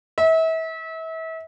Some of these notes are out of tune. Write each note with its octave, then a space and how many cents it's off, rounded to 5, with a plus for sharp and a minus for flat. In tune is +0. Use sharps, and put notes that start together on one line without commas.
E5 -35